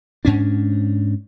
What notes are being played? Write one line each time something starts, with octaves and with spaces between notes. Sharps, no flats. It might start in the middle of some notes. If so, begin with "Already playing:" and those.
G#2 C#4 D4